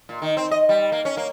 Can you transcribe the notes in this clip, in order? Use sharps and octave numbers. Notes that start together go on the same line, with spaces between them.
A#2
D#3
C4
D#5
G3
A#3
C#4
A#3